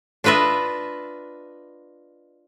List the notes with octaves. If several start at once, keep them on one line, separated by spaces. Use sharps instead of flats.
D4 F4 B4 D#5 E5